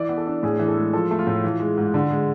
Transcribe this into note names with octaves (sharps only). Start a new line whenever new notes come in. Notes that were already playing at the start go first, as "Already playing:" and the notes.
Already playing: E3 D5
B3
A4
D4
A2 G#4
E3
A4
G#3
F3 A4
A3
F4
A2
E3
G#3
G#2
D3
G#3